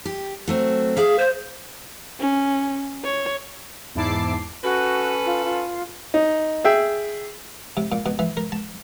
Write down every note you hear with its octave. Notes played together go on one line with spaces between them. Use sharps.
G4
F#3 A3 C4
G#4 E5 F5
C5
C#4
C#5
E2 G#2 E4 A5 D6 C7
C#4 F#4 A4 B4
F4
F4
D#4
G#4 E5 G5
C3
A#2
B2
E3
A#4
A5